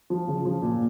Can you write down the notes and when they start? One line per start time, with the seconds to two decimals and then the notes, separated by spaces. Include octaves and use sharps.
0.10 F3
0.28 C#3
0.45 F3
0.62 A#2